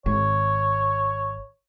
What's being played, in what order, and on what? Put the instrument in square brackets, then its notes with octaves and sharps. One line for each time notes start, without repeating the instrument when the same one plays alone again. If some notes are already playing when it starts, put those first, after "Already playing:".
[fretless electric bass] G#1 [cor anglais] C#5